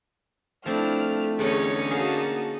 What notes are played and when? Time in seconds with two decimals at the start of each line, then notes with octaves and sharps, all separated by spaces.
0.66 F3 A3 C4 D4 E4 F6
1.39 E2 D3 C#4 D#4 A4 C#5
1.91 A#3 F#4 G#4 F5 A5